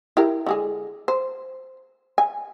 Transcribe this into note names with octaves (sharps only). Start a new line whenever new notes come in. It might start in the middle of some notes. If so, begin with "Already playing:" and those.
E4 G4 A#4
D3 G#3 G#4
C5
G#5